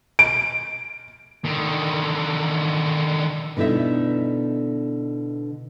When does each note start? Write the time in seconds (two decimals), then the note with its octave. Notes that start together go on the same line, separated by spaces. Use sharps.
0.19 D7
1.45 D3 D#3
3.57 B2 D3 D#4 E4 E5